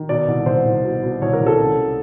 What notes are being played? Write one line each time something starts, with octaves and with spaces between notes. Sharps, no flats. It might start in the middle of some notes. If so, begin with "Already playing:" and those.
Already playing: D#3
B2 D5
C2
C2 C5
C2
B2
B2
C2 C#5
A#4
C2
A4
C#2